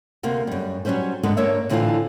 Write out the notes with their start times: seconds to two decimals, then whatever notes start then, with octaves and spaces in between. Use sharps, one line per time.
0.23 D2 C3 A#3 B3
0.47 F#2 G3
0.85 F#3 G3 C#4 B4 C5
1.23 G#2 D3 G#3 B3 D4 B4
1.37 G#2 A#3 D4 C#5 E5
1.70 A2 D3 E3 C4 D4 F4